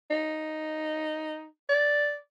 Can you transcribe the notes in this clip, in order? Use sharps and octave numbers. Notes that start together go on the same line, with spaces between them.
D#4
D5